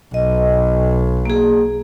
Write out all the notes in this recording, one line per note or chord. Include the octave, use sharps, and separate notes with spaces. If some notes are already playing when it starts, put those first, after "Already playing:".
B1 D#5
A#3 G#4